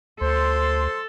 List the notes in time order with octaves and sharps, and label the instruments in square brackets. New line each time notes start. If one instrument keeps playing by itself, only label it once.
[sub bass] D2 [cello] A4 [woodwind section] C5 C6